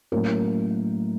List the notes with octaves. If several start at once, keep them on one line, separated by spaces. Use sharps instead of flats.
A2 F#3 A#3 C#4 A#4